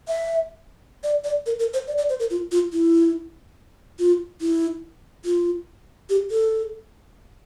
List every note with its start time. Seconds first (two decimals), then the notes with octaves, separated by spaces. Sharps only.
0.08 E5
1.04 D5
1.24 D5
1.46 A#4
1.59 A#4
1.73 C5
1.87 D5
1.98 D5
2.09 C5
2.20 A#4
2.30 F4
2.52 F4
2.73 E4
3.99 F4
4.41 E4
5.25 F4
6.10 G4
6.31 A4